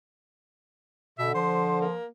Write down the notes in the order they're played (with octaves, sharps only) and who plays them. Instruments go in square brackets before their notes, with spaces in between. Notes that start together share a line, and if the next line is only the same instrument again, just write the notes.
[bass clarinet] B2 [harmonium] D3 [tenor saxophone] E5
[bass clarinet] F3 [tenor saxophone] C5
[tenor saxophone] A#3